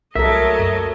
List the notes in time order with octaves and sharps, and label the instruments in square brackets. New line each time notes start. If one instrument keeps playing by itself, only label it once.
[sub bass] C2 [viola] F#3 D#5 [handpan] A4 A#4 [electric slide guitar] E5
[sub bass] F#2